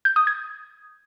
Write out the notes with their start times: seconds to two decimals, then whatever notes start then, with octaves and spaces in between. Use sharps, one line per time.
0.05 G6
0.16 D#6
0.27 G#6